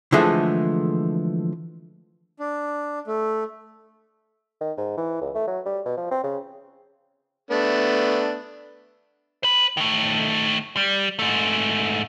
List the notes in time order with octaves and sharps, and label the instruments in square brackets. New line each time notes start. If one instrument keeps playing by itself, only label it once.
[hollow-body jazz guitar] D3 E3 F3 G#3 A3 G#4
[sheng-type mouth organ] D4
A3
[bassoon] D#3
G#2
E3
C#2
A3
F#3
G3
B2
F3
C4
C#3
[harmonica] A3 B3 D4
[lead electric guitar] C5 B5
D#3 A3
G3
G#2 A3